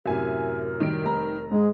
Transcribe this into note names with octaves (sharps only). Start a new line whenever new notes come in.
F#2 A2 C3 A#4 E5 G#5
D#3 G3 D7
F1 A#5
G#2 G#3 G#4